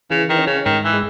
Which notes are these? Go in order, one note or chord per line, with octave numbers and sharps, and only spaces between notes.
C#3 E3
D#3
C#4
C#3
G#2 D#3
E3
G#3